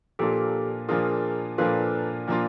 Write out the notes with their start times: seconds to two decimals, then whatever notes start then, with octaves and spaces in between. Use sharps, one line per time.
0.19 A#2 F3 A#3 D4 F4 G4 A4
0.89 A#2 F3 A#3 D4 F4 G#4 A#4
1.58 A#2 F3 A#3 D4 F4 A4 B4
2.28 A#2 F3 A#3 D4 F4